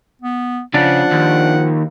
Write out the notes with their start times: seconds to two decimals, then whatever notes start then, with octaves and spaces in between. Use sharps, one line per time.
0.22 B3
0.74 C#3 F3 D4 F#5
1.12 D#2